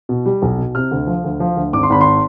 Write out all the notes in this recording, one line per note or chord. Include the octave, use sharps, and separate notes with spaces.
B2
G3
B1
B2
C3 F6
D2
F3
D2
F3
D2
G#1 D6
C6
G#1 B5
C6